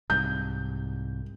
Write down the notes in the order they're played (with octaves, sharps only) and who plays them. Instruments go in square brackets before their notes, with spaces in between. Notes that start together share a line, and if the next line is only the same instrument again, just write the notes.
[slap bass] C2 G#2 [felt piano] G6